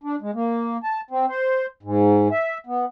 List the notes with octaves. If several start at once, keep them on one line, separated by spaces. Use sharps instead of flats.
D4
G#3
A#3
A5
C4
C5
G#2
E5
B3